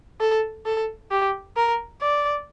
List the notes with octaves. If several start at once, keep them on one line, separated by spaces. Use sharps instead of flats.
A4
A4
G4
A#4
D5